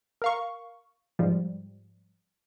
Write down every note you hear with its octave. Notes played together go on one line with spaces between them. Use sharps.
A#4 F5 C#6
G#2 F3 G3